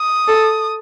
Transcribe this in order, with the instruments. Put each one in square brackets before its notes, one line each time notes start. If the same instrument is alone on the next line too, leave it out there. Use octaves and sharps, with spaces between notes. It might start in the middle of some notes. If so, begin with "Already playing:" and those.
Already playing: [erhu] D#6
[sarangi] A4